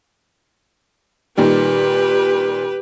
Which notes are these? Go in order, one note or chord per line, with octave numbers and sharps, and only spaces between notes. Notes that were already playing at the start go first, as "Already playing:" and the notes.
A#2 D#3 G3 G4 B4